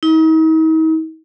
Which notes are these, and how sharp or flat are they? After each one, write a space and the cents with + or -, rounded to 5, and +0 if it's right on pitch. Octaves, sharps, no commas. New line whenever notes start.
D#4 +45